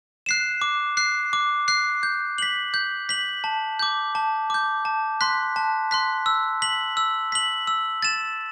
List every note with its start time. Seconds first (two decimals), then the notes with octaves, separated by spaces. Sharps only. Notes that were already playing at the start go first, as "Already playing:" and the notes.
0.26 F#6 C7 E7
0.62 D6
0.97 F#6 C7
1.33 D6
1.68 F#6 C7
2.03 G6
2.38 B6 F#7
2.74 G6
3.09 B6 F#7
3.44 A5
3.79 D6 G6
4.15 A5
4.50 D6 G6
4.85 A5
5.21 C6 F#6 B6
5.56 A5
5.91 C6 F#6 B6
6.26 E6
6.62 B6 F#7
6.97 E6
7.32 B6 F#7
7.67 E6
8.02 A6 E7